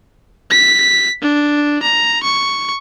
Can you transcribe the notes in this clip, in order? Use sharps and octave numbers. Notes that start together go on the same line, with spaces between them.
B6
D4
A#5
C#6